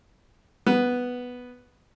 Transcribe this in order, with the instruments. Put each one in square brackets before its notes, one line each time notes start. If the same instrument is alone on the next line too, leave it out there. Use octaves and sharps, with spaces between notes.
[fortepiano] B3